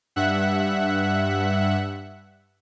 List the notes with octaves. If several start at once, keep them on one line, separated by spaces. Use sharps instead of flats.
G2 E5 F#5 F#6